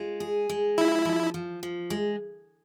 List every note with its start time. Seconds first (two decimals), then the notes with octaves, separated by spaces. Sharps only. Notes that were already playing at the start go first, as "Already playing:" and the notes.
Already playing: G#3 F4
0.20 G#4
0.49 G#3
0.78 F3 E4
1.05 F3
1.34 F3
1.63 F3
1.90 G#3